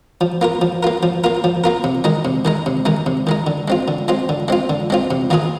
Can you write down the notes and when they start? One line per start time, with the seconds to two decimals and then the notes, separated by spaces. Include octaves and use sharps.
0.21 F3
0.41 A#3 F4 A#4
0.62 F3
0.83 A#3 F4 A#4
1.03 F3
1.24 A#3 F4 A#4
1.44 F3
1.64 A#3 F4 A#4
1.84 C3
2.04 D#3 G#3 D#4
2.25 C3
2.45 D#3 G#3 D#4
2.66 C3
2.85 D#3 G#3 D#4
3.06 C3
3.27 D#3 G#3 D#4
3.47 D3
3.68 G#3 C4 F4
3.88 D3
4.08 G#3 C4 F4
4.29 D3
4.48 G#3 C4 F4
4.70 D3
4.90 G#3 C4 F4
5.11 C3
5.30 D#3 A#3 F4 G#4